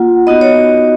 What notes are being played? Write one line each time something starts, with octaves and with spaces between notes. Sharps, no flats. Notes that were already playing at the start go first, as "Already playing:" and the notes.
Already playing: A#3 F4 F#5
B3 D#4 F#4 D#5
C#5